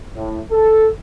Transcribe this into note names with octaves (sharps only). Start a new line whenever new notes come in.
A2
A4